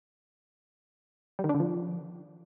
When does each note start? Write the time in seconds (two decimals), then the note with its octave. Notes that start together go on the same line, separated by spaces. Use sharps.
1.39 G3
1.44 D#3
1.49 D4
1.55 D3
1.60 F3